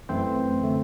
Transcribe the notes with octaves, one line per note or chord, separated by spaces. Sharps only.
F#2 E3 A3 C4 C5
D3 A3